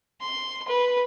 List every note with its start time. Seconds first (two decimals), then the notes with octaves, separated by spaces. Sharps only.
0.21 C6
0.68 B4